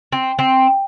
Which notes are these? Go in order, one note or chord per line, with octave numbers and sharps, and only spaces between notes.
C4
C4